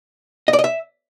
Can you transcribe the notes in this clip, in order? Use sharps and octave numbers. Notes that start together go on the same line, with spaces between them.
D#5
D5
D#5
E5